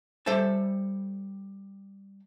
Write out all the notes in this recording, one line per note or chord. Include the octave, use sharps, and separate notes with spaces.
G3 A4 C5 E5 A5